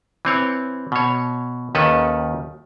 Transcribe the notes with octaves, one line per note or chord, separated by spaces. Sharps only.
E3 C4 C#5
B2 C#5
D#2 D#3 C#4 A4 B4